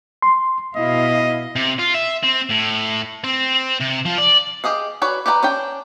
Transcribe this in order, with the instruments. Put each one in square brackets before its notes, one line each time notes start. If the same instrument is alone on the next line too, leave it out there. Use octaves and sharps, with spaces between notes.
[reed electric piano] C6
[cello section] B2 E4 F5 [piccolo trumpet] D#5
[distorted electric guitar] C3
F4
E5
C4
A2
C4
C3
F3
D5
[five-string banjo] G4 G#4 D#5 F5
F#4 B4 C#5 D5
G4 B4 D5 F#5 A#5
C#4 D4 G5